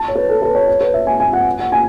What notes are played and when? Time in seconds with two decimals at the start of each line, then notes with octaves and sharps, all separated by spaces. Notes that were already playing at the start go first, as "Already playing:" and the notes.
Already playing: A5
0.08 C#5
0.15 B4
0.29 A4
0.42 B4
0.55 C#5
0.68 C#5
0.81 B4
0.94 E5
1.07 G#5
1.20 G#5
1.33 F#5
1.59 F#5
1.72 G#5